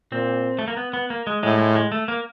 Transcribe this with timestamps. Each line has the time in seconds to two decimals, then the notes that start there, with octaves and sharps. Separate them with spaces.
0.11 A#2 C4
0.59 A3
0.68 A#3
0.77 B3
0.93 B3
1.10 A#3
1.27 G#3
1.43 A2 G#3
1.58 G#3
1.75 G#3
1.92 A3
2.08 A#3